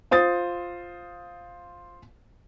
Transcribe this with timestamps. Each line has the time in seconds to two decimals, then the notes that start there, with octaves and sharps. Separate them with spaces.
0.11 F4 C5 D#6 A6